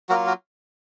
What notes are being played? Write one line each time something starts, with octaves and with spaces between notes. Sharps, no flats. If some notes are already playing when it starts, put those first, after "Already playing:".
F#3 A#3 F4 F#4 A#4
F#4 A#4